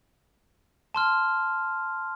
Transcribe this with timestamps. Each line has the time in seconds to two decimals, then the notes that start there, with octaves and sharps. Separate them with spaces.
0.94 A5 C6 F6